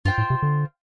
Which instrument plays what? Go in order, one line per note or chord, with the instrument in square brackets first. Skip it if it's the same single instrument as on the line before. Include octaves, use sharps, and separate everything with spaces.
[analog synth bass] G2 [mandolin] F4 C5 G5
[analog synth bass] A2
C3
D3